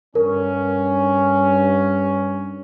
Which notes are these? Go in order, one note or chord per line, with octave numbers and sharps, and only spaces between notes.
G2 C#4 A#4